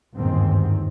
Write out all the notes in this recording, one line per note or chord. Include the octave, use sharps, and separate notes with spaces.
G1 D#2 G#2 C4